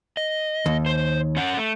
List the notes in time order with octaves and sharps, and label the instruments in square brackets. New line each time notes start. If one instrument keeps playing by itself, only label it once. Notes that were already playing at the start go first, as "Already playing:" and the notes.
[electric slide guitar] D#5
[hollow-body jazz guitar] D#2
[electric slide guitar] C5
C#4 C#5 F#5
A3